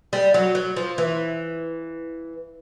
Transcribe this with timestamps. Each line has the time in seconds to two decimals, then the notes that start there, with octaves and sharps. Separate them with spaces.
0.13 G3
0.34 F#3
0.55 F#3
0.76 F3
0.98 E3